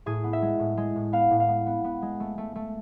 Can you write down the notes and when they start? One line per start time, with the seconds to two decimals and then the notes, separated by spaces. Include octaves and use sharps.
0.06 A2 G#4
0.24 B3
0.33 E5
0.42 G#3
0.60 A2
0.77 G#3
0.96 A2
1.12 B3 F5
1.31 A2
1.40 F5
1.49 B3
1.66 B3
1.84 B3
2.02 G#3
2.20 A3
2.38 A3
2.56 A3